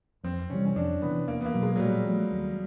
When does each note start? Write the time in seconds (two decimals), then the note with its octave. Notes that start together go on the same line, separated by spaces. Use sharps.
0.24 F2 C4
0.50 C3 E3 G3 C#4
0.65 C#4
0.76 F2 D4
1.02 C3 E3 B3
1.27 E2 A#3
1.41 B3
1.45 A#3
1.54 B2 F#3 B3
1.63 G#3
1.76 F#3
1.79 A#2 G3
2.06 F3 A3
2.31 D#2